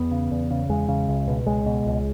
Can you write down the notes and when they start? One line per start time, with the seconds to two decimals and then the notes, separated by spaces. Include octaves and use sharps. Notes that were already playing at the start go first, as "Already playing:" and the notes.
Already playing: E2 B3
0.11 C#3
0.31 E2
0.51 C#3
0.69 E2 G#3
0.88 C#3
1.09 C#2
1.28 B2
1.46 C#2 G#3
1.66 B2
1.86 C#2